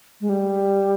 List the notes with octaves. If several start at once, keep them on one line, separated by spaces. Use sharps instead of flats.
G#3
G3